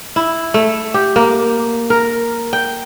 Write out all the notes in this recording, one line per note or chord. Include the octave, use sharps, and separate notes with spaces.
E4
A3
G4
A#3
A#4
G5